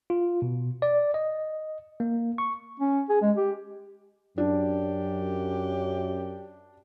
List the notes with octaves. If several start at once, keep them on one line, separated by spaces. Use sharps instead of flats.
F4
B2
D5
D#5
A#3
C#6
C#4
G#4
G#3
G4
F#2 D4 G4